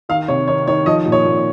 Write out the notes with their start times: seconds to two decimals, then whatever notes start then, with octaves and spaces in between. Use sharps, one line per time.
0.09 D#3 F5
0.28 C3 C#5
0.48 D#3 C#5
0.67 D#3 C#5
0.86 F3 D#5
1.06 A#2
1.12 C#5
1.25 A#2